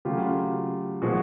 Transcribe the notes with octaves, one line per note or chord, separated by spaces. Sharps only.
C#3 F#3 A3 F4 G4
A#2 F3 G#3 F#4 G#4